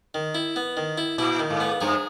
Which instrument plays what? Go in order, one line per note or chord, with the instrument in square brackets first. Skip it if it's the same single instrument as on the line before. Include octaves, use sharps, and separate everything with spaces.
[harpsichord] D#3
E4
B3
D#3
E4
[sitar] A#2 [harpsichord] E4
[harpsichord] D#3
[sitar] G#2
[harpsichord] B3
[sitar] G2 [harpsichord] G#4